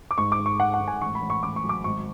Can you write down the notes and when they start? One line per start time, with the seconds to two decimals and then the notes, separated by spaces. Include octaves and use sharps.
0.11 D6
0.18 G#2 C#6
0.32 D6
0.40 G#2
0.46 C#6
0.60 G#2 F#5
0.74 F#5
0.81 G#2
0.88 G#5
1.01 A1 C#6
1.15 B5
1.22 A1
1.30 C#6
1.43 A1 D6
1.56 C#6
1.64 F#3
1.69 D6
1.84 G#1 C#6